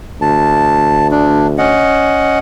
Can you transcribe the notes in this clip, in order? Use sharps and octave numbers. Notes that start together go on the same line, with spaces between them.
D2 A5
D4
C#4 D#5 F#5